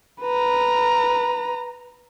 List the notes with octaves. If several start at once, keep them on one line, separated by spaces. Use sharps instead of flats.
B4 A#5